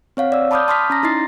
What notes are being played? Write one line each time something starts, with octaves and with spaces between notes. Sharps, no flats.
C4 C#5 F5 F#5
D5 E6
A5 B5 D6 D#6 F6 G6
A5 C6 D6 D#6 F6 B6
C#4 A#5 A#6
D#4 E4 C6 A6 C7